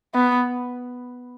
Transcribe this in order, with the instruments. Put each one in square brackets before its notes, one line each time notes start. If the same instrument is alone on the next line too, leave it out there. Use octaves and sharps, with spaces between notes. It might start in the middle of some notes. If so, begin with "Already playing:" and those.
[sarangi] B3